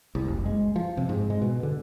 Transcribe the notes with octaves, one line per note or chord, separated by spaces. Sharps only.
C2
F#1
G#3
F3
C3
G#2
G#3
B2
D3